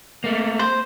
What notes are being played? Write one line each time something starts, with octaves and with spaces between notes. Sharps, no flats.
A3 A#3
C5